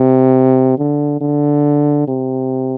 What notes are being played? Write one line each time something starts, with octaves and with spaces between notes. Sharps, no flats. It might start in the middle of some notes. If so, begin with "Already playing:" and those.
Already playing: C3
D3
D3
C3